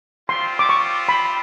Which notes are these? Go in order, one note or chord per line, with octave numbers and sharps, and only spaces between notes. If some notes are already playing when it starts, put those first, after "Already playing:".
G3 C4 F4 C6
D6
C#6
B5